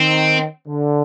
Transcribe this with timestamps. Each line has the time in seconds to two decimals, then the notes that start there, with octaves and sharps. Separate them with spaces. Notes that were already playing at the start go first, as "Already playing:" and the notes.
Already playing: D#3 C4
0.67 D3